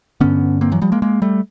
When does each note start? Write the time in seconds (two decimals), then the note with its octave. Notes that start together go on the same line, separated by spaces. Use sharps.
0.20 G2 D3 B3 C#4
0.61 A#3 C4
0.72 E3 F#3
0.81 F3 G3
0.92 G#3 A#3
1.02 G#3 A#3
1.22 G3 A3